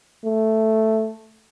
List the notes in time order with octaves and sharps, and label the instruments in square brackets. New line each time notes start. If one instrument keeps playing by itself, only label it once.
[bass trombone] A3